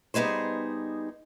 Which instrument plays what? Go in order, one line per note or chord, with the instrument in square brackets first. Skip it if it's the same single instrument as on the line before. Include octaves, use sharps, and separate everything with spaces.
[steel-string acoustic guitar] G3 B3 D#4 G#4 C5